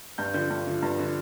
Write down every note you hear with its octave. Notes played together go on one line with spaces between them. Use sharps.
G2 G6
D3 F3 G6
G2
D3 F3
G2
D3 F3